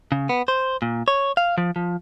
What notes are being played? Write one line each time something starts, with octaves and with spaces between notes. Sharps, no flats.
C#3
B3
C5
A#2
C#5
F5
F3
F3